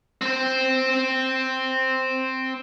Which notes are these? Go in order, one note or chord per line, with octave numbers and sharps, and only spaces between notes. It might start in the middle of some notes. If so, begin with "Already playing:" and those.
C4 C5